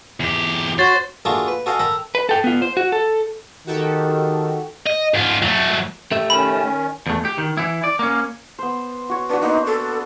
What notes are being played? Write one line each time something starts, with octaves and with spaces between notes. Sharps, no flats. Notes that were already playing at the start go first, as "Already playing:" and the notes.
E2 G4
F#4 C5 C#5 A6
A3 A#3 D4 F4 F#4 G#4
B4
F#4 A4 D#5 F5 G5 G#5
A4 A#4 G5 A#5 B5
B4
A4 G5
B3 F4
C5
F#4
A4
D#3 F#4 G4 A4
D#5
G#2 F4
F#3 A3
A3 G4 E5
D#3 C#4 B5
E2 A3
G4
D#3
E3 E4
D5
A#3 C#4
B3 C5
F#4 C#5
D4 F#4 B4
A#3 B3 D#4 C5
A4